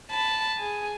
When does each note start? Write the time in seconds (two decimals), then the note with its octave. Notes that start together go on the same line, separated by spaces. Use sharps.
0.11 A5 B5
0.59 G#4